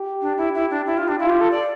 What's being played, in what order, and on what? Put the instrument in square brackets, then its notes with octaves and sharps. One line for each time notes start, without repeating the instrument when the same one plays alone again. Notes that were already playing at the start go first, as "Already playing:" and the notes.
Already playing: [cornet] G4
[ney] D4
E4
E4
D4
E4
F4
D4
[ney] E4 [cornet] F4
[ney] G4
A4
D5